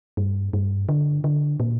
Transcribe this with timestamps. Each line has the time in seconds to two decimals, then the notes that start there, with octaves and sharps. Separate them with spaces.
0.17 G2
0.53 G2
0.89 D3
1.24 D3
1.60 A#2